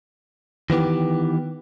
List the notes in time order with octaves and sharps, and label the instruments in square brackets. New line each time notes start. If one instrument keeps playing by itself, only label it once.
[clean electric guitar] D#3 E3 B3 G4